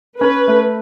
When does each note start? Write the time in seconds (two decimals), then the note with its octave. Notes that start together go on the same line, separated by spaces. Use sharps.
0.21 C#4 B4
0.48 A3